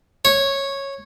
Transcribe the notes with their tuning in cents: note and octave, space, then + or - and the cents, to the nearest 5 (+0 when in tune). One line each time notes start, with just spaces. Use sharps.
C#5 -10